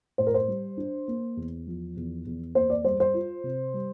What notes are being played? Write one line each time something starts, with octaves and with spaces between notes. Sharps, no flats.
A2 C5
A#4
C5
G3
D4
A#3
E2
F3
E2
E2
A#3 C5
D5
G3 C5
C5
F4
C3
G3